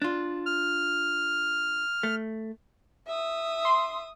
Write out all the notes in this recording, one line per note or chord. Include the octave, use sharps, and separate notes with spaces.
D4 F4
F6
A3
E5 D#6
C6